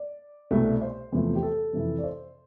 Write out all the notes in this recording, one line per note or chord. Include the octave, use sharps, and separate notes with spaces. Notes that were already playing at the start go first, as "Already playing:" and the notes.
Already playing: D5
C2 B2 A3
C5
E2 C3 F3 A3
G4
A4
F2 C3 E3
D5
C5